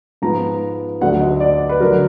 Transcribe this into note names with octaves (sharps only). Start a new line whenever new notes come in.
G#2 F3 B3 A#5
D2 D3 F#3 F#5
D#5
D5
B4
D3 F#3 A#4